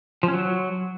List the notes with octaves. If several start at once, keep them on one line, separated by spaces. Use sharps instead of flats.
F3
C#4
F#3